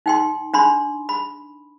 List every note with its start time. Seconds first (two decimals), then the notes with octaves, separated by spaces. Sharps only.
0.06 D#4 G5 C6
0.54 D4 B5 C6
1.09 B5